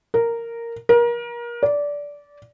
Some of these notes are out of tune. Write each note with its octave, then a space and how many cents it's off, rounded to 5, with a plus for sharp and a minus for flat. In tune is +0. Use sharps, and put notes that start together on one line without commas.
A#4 -5
A#4 +30
D5 -15